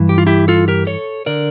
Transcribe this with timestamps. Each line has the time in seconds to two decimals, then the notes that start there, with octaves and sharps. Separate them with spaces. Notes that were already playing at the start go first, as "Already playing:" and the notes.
Already playing: G2 E3
0.09 G4
0.18 F4
0.27 E4 G4
0.48 F4 A4
0.68 G4 A#4
0.87 A4 C#5
1.26 D3 A#4 D5